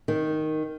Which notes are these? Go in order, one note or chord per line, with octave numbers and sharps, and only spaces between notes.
D#3